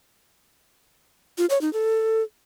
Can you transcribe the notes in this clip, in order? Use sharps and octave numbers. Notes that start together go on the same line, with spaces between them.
F4
C#5
D#4
A4